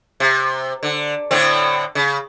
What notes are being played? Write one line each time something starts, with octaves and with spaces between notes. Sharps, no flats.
C3
D3
A2 D3 C4
C#3